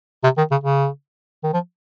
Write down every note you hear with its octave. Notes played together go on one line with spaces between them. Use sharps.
C3
D#3
C#3
C#3
D#3
F3